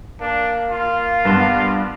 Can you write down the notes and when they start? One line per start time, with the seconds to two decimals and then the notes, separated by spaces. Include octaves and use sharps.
0.21 A#3 D4
0.71 F4
1.25 G2 B3 B4 A5 C6